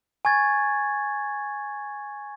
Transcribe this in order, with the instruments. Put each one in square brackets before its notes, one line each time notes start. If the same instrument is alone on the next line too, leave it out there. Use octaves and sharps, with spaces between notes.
[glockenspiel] G#5 C#6 G#6 A6